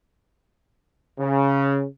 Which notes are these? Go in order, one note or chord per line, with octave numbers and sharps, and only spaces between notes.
C#3